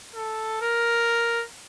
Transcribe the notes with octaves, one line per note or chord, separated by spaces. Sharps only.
A4
A#4